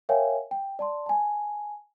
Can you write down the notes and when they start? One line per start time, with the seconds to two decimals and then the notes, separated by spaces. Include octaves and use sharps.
0.09 A#4 C#5 E5 F5 G5 G#5
0.51 G5
0.79 D5 A5 C6
1.06 G#5 A5